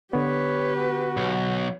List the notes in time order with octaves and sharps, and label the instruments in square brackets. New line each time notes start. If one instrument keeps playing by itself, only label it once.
[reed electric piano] D3 B3 [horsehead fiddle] G4 B4 [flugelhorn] C#5
[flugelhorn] F#4
[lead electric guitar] B1